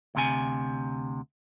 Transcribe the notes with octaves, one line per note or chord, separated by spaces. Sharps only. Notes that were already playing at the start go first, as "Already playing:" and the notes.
D2 C3 G#5